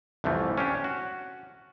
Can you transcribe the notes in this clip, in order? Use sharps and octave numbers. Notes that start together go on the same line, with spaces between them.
C2 F2 E3 F3 A3
C#4 D4 G4
F#4